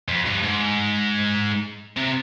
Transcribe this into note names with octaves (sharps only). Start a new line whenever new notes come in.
F2
G2
G#2
C3